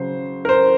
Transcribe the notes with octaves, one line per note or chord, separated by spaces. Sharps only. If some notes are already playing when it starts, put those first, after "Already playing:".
Already playing: C#3 F#3 C5
A#4
C5